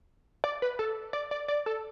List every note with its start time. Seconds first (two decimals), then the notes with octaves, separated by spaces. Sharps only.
0.44 D5
0.62 B4
0.79 A4
1.13 D5
1.31 D5
1.48 D5
1.66 A4